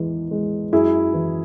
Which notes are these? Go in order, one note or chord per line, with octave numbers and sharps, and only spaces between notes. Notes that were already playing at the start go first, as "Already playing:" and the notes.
Already playing: E2 E3 G#3
G#3
F#2 E4 G#4
E3